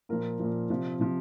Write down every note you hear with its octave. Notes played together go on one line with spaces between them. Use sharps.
A#2 F3 A#4
A#2 F3
C3 F3
C3 F3